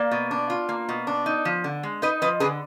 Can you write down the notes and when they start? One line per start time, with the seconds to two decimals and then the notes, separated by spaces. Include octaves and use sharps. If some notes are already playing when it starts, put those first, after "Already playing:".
Already playing: A#3 D5 F5
0.11 B2
0.31 D4
0.50 F4
0.69 A#3
0.89 B2
1.07 D4
1.26 D#4
1.45 F3
1.64 D3
1.83 G#3
2.02 D#4 B4 D#5
2.22 F3 B4 D#5
2.40 D3 G#4 B4